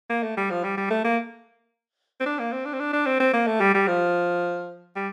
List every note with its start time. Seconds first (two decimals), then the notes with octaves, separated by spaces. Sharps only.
0.10 A#3
0.23 A3
0.37 G3
0.50 F3
0.64 G3
0.77 G3
0.90 A3
1.04 A#3
2.20 C4
2.26 D4
2.39 A#3
2.53 C4
2.66 D4
2.74 C4
2.80 D4
2.93 D4
3.06 C4
3.20 C4
3.33 A#3
3.47 A3
3.60 G3
3.74 G3
3.88 F3
4.96 G3